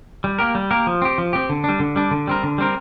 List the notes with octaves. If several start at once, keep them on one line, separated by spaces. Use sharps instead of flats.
G3
A#3 G4 A#4
G3
A#3 G4 A#4
F3
C4 G4
F3
C4 G4
D3
G3 D4
D3
G3 D4
D3
G3 C4 A#4
D3
G3 C4 A#4